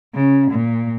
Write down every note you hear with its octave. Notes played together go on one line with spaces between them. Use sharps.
C#3
A#2